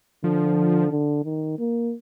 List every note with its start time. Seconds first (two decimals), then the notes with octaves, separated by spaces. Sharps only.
0.24 D3 F3
0.91 D3
1.25 D#3
1.59 A#3